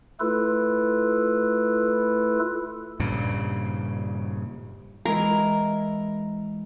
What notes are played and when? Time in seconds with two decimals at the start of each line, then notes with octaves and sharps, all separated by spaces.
0.20 A3 E4 F4 A4 B4
3.00 G2 A#2 C#3
5.05 E3 G#3 E4 A#4